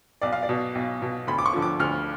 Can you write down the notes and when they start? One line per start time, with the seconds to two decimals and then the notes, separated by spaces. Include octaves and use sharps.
0.22 B1 D5
0.33 F5
0.43 D5
0.49 B2
0.75 B1
1.02 B2
1.27 D2 B5
1.39 D6
1.46 C#6
1.53 D3 F3
1.62 D6
1.80 D2 F6